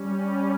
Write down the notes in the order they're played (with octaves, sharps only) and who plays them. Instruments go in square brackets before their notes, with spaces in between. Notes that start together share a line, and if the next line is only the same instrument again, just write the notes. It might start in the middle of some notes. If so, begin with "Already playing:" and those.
Already playing: [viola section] G3 C#4